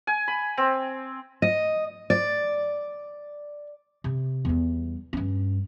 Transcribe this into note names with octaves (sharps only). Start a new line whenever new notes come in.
G#5
B5
C4
D#5
D5
C3
E2 G3
G2 C#4